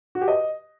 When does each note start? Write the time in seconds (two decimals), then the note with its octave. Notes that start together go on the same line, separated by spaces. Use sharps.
0.15 F#4
0.21 G4
0.28 D#5